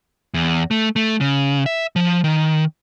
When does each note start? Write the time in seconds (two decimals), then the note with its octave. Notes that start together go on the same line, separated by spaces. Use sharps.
0.34 E2
0.71 A3
0.96 A3
1.21 C#3
1.66 E5
1.96 F3
2.24 D#3